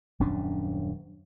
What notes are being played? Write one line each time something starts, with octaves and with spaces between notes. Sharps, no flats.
D#1 F#2 C#4 D4